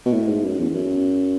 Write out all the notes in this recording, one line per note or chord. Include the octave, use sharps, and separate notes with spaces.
B2
A2
G#2
F#2
E2
E2
F#2